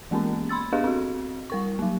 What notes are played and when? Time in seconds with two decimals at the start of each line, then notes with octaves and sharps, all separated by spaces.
0.11 E3 G#3 A#3 B3 C#4
0.49 B5 C6 E6 A6
0.72 B3 D4 G4 G#4 D#5 F5
0.84 C4 F#4
1.50 G3 A#4 C#6
1.79 F#3 A#3